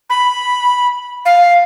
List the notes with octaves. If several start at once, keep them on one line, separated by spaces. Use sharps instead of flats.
B5
F5